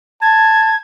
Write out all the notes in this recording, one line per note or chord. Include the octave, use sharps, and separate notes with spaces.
A5 G#6